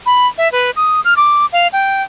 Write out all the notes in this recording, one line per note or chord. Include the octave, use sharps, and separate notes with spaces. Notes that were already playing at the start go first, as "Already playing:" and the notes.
B5
E5
B4
D#6
F6
D6
F5
G5